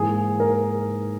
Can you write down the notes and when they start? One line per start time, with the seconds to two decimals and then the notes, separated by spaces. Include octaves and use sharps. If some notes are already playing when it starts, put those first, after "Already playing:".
Already playing: G#2 E3 A#3 G#4
0.40 A#4